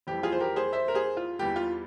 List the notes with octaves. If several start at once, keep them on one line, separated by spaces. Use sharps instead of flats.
F2 E3 G3 G4
F4 G#4
C5
G4 A#4
G#4 C5
C5 E5
A#4
G#4 C5
F4
E2 E3 G3 G4
F4